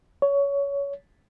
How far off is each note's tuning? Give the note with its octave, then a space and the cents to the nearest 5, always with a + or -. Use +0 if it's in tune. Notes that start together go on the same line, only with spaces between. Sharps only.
C#5 +20